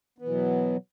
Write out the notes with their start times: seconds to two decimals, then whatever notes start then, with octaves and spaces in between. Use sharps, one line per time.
0.18 B3
0.22 E3
0.25 B2
0.29 F#3